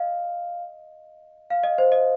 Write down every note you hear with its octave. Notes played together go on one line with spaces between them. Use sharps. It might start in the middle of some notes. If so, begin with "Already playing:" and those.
Already playing: D#5 F5
F5
D#5
C5
D#5